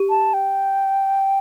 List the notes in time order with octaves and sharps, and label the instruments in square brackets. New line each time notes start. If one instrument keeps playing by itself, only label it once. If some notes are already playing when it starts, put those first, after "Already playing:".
Already playing: [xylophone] G4
[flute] A5
G5